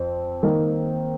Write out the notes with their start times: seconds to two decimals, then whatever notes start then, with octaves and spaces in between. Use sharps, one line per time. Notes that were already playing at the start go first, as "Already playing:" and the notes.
Already playing: F2 C4
0.43 D#3 A#3 D#4